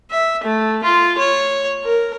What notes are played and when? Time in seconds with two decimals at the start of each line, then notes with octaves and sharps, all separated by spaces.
0.11 E5
0.44 A3
0.84 F4
1.18 C#5
1.84 A#4